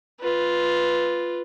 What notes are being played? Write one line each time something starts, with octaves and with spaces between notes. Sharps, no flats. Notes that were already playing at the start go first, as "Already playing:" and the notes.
F4 B4